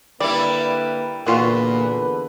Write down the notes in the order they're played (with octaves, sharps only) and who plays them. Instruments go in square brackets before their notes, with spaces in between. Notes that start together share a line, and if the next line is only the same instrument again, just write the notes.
[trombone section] D3 A#3 B4 [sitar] G3 E4 [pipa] D5
[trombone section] E2 D3 B4 [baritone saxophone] A#2 [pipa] F4 F#4